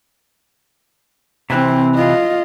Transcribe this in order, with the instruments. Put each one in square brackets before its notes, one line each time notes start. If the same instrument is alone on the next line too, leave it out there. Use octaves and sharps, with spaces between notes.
[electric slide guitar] C3 E3 [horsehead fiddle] C4
[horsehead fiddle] F4 D#5